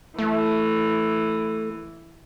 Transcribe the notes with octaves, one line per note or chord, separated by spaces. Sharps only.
E3 A3